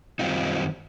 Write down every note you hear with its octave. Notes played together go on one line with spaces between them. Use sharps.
F#2 D#3 G3 C4 D#4 F4